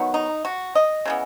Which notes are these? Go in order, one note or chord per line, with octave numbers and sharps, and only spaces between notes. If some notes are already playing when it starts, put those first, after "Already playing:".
Already playing: D#3 F#3 B3
D#4
F#4
D#5
C#3 E3 B3